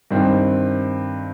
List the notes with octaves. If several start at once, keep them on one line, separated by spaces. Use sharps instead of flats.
G2 D#3 C4